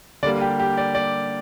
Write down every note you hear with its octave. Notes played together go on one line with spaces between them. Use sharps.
D3 G3 A#3 D5
G4
G4
D5
D5